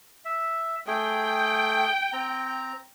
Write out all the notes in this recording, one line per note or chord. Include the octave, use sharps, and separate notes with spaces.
E5
A3 G#4 G5
C4 A#5